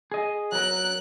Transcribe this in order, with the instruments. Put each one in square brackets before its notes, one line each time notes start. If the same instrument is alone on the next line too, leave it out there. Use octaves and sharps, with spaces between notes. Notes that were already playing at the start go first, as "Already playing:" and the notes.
[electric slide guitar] G#4 D#5
[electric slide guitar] F#3 A#4 [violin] F#6